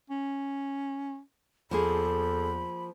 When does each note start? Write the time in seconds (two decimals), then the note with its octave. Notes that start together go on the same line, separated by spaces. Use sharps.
0.10 C#4
1.71 E2 F3 A#3 G#4 A4 B5